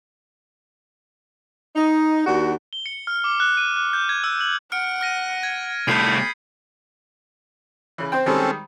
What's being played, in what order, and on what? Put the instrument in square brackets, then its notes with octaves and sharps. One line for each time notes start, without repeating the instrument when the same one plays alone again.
[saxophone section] D#4
D#2 D4 F#4
[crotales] G7
C#7
F6
D6
F#6
D#7
F#6
G6
G#6
E6
F#7
[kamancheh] F#5 [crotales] F6 C#7 D7
[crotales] F6 A#6 D#7
G#6
[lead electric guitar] C2 A3 [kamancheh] B5 [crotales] D#6 G6 C7
[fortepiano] C#3 E3
C4 C5 G5
[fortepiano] D#3 G3 G#3 [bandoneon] C4 C#4 A4